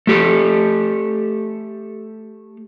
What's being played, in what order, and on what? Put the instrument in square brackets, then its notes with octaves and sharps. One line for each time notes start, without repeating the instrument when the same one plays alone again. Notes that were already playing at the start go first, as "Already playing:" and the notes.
[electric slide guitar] A3 G4 A4